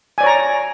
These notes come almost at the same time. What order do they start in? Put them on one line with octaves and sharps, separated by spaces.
G#5 D5 C#5 A#5